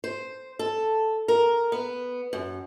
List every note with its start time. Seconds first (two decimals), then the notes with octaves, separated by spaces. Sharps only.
0.04 C5
0.59 A4
1.28 A#4
1.72 B3
2.33 F#2